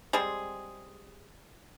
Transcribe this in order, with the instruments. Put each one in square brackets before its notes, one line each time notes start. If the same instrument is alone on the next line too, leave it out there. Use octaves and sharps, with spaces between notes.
[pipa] G3 G#3 C4 G#4